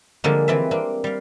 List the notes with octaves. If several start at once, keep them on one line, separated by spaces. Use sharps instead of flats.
D3 F3 G3 G#3 A#3
E3 C4 B4 D5 E5
A#3 C4 D4
G3 F5